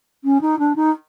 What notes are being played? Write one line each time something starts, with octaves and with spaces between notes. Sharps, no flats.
C#4
D#4
D4
D#4